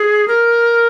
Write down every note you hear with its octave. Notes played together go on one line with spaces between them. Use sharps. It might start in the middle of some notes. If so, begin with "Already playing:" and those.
Already playing: G#4
A#4